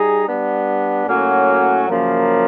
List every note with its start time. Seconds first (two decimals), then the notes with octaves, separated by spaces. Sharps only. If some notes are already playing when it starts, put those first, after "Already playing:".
Already playing: G3 D#4 G#4
0.26 G3 B3 D4
1.07 A2 F#3 A#3 C#4 F#4
1.89 F#2 C#3 F3 A#3